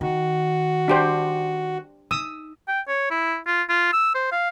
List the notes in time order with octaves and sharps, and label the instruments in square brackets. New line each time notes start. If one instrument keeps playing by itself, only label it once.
[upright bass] D#3 [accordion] F#4
[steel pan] D4 G4 C5
[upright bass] D#4 [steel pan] D#6 E6
[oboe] G5
C#5
E4
F4
F4
E6
C5
F5